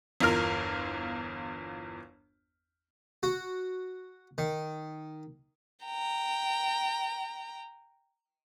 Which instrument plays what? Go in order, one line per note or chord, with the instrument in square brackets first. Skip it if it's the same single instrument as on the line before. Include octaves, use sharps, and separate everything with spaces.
[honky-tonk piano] G1 E2 F4 A#4 F6
[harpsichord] F#4
D#3
[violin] G5 A#5